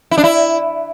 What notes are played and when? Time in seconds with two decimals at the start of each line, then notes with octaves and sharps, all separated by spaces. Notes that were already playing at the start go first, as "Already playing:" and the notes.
0.11 E4
0.18 D4
0.24 E4